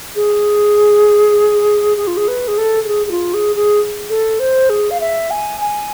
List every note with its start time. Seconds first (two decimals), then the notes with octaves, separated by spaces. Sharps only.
0.15 G#4
1.97 G#4
2.07 F4
2.17 G#4
2.28 B4
2.48 G#4
2.58 A4
2.84 A4
2.88 G#4
3.06 G#4
3.11 F4
3.34 G#4
3.56 G#4
4.09 A4
4.39 C5
4.69 G#4
4.90 F5
5.00 E5
5.31 G#5
5.61 G#5